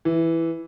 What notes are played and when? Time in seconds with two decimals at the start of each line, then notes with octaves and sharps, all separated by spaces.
0.05 E3